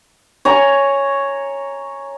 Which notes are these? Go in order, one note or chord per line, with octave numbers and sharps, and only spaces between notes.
C#5 G#5 A#5